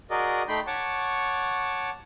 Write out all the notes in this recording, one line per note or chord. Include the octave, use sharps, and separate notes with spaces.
F#4 G#4 A#4 D5 D#5
A3 D#4 G5 B5 C6 G6
C#5 F#5 A5 C#6 D6